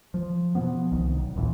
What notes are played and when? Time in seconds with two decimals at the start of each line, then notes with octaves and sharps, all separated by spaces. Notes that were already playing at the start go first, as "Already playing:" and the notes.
0.14 F3
0.55 B2 F3 B3
0.92 C2 D#3
1.17 B1
1.36 D#1 A1 A#2 E3